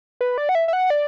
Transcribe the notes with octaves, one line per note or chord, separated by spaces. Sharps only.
B4
D5
F#5
E5
E5
F#5
D5